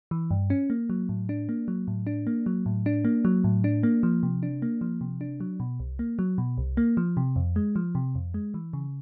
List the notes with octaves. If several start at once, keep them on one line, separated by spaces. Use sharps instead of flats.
E3
G2
C#4
A#3
F#3
A2
D4
A#3
F#3
A2
D4
A#3
F#3
A2
D4
A#3
F#3
A2
D4
A#3
F3
C3
D4
A#3
F3
C3
D4
F#3
B2
C2
A#3
F#3
B2
C2
A#3
F3
C3
F2
G#3
F3
C3
F2
G#3
E3
C#3